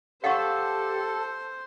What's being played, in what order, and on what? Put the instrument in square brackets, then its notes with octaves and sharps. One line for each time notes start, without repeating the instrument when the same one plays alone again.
[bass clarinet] G4 [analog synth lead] A4 [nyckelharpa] C5 [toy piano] F5 F#5 C#6